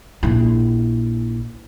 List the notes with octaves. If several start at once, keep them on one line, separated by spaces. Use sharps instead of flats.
A#1 E4